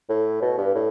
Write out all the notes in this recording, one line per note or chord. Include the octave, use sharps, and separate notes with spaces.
A2
B2
G2
A2